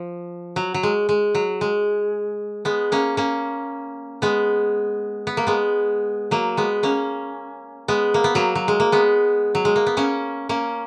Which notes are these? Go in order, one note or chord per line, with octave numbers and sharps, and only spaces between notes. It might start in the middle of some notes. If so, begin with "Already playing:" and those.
Already playing: F3
F#3
F#3
G#3
G#3
F#3
G#3
G#3 B3
A#3 C#4
A#3 C#4
G#3 B3
B3
A#3
G#3 B3
F#3 A#3
G#3 B3
A#3 C#4
G#3 B3
A#3
B3
F#3 A#3
F#3
G#3
A#3
G#3 B3
F#3
G#3
A#3
B3
A#3 C#4
A#3 C#4